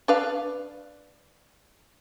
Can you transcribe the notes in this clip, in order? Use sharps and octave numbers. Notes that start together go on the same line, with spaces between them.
D4 B4 F5